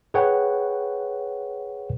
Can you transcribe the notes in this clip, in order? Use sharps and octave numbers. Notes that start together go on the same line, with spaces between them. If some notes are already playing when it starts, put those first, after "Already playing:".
G#4 B4 C#5 F#5 G5